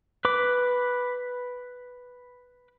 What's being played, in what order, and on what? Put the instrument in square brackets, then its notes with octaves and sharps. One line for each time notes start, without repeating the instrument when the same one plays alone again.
[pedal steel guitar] B4 D6